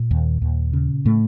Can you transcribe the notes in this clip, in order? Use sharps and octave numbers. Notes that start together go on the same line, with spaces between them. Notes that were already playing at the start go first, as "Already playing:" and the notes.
Already playing: A#2
D#2
D#2
C#3
A2 A3